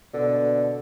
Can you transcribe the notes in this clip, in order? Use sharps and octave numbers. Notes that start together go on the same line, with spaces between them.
B2 D3